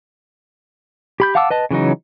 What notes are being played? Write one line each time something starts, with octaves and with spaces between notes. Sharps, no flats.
G4 B5 G6
F5 F#5 A5 D6 E6
B4 D#5 A5
C#3 E3 F#3 D#4